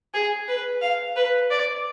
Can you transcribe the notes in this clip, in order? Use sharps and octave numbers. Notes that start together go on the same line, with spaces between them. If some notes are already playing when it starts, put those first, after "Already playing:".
G#4
B4
F5
B4
D5